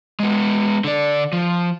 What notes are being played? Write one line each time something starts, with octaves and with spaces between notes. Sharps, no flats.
G#3 B3
D3 D5
F3